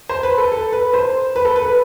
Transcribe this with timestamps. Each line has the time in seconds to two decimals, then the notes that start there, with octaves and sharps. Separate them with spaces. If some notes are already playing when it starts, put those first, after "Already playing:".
0.09 C5
0.23 B4
0.38 A4
0.52 A4
0.72 B4
0.94 C5
1.36 B4
1.45 A4
1.56 B4
1.66 B4